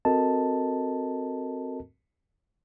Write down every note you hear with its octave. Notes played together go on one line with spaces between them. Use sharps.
C4 F#4 A4 A#4 D#5 A5